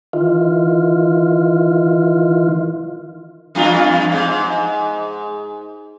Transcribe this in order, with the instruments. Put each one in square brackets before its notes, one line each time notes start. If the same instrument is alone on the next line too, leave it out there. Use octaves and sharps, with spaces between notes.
[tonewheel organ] D#3 E3 F4
[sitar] E2 G2 F4
G#2